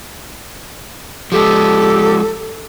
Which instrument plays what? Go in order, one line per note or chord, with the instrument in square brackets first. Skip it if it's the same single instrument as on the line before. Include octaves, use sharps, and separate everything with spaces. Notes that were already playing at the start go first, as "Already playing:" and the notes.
[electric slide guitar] F3 G#3 [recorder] G4 [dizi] A4